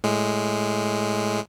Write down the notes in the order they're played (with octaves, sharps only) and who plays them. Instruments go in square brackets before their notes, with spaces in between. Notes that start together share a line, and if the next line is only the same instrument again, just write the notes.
[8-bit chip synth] A2 G#3